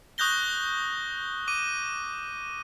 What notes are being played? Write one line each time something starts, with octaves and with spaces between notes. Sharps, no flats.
C#6 D#6 F#6 G6 A#6 G7
D6 D#7